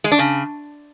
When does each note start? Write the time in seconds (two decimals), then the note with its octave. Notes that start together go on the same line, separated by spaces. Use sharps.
0.04 G#3
0.12 D4
0.19 C#3